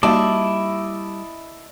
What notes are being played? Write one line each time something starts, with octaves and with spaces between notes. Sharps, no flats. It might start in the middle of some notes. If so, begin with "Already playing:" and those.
G3 A#3 D#4 E4 F#4 D5 D#5 A5